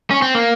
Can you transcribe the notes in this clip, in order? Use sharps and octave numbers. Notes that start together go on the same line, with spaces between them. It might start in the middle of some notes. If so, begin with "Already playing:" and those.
C#4
C4
A#3